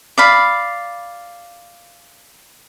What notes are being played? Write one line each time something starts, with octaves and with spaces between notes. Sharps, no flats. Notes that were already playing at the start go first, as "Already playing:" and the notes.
D5 F5 B5